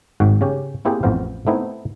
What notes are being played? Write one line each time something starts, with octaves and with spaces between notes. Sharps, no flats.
G#1 G#2 F#4 G5
C#3 C#4 G4
A#3 C4 E4 G4 G#4 C5
A1 F2 B3 C5 F5
A3 B3 C4 D#4 E4